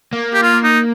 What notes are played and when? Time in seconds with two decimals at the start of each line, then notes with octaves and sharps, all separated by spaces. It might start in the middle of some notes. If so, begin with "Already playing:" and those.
0.13 A#3
0.34 G4
0.42 F4
0.64 D#4